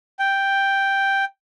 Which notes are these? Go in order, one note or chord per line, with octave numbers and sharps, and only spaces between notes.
G5